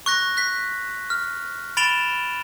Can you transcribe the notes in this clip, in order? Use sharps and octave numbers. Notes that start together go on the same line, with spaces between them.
C#6 F#6 A#6
F#6 B6
F6
B5 A6 D7 E7 F7 G7